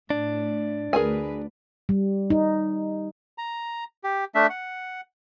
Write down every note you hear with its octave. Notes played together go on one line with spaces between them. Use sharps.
A2 D4
D2 G#4 A#4 B4 G#5
G3
D#4
A#5
G4
A3 D4 E5
F#5